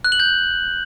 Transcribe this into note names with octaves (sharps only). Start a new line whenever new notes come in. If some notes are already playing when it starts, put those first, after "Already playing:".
F#6
F#7
G6